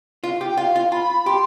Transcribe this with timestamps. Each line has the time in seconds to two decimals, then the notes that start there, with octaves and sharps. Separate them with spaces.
0.24 F4
0.41 G4
0.49 G5
0.57 F4 F5
0.76 F4
0.92 F4 B5
1.26 G4 C6